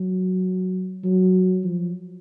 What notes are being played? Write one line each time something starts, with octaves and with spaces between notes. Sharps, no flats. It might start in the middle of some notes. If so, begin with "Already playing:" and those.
Already playing: F#3
F#3
F3